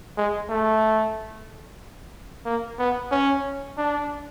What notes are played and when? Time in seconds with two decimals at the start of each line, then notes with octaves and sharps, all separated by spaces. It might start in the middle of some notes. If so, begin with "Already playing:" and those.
0.17 G#3
0.50 A3
2.46 A#3
2.79 B3
3.12 C#4
3.78 D4